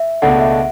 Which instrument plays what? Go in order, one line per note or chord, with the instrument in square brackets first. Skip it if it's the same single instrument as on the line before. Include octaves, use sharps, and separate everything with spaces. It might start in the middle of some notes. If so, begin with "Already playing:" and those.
Already playing: [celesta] E5
[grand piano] C#2 B2 A3 D4 [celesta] F#5
[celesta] E5